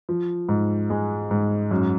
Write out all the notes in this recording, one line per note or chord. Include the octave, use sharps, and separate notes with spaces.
F3
G#2
G#3
G#2
F#2